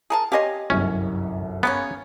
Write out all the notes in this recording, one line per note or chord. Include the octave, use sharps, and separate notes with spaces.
G#4 A#4 A5
G4 C#5 D#5 F5 G#5 C6
G1 C2 F#2 C#4
C#3 A#3 B3 C#4